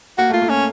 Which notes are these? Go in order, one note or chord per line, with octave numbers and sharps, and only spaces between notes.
A#3 F#4
A3 F4
A#3
C#4